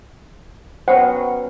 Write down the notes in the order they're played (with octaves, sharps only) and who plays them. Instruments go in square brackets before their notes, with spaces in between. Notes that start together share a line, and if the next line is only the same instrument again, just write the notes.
[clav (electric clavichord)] F#3 B3 C#4 [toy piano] C5 F#5 G5